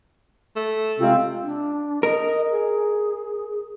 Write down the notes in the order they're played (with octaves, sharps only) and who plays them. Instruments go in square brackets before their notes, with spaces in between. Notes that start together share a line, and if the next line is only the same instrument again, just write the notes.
[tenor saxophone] A3
[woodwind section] C3 G#3 C4 [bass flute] F4
[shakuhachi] D4
[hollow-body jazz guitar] A#4 [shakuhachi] D#5
[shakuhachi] G#4